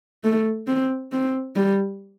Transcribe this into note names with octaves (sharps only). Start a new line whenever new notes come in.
A3
C4
C4
G3